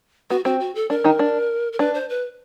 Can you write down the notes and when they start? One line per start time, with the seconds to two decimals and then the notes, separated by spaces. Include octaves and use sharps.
0.30 B3 F#4
0.45 C4 F#4
0.60 F#4
0.75 A4
0.90 D4 A#4
1.04 D#3 D#4
1.19 D4
1.73 A#4
1.79 D4 B4
1.94 C5
2.09 B4